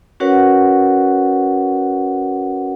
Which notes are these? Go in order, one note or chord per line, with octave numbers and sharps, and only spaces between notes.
C#4 F#4 A#4 B4 C#5 F#5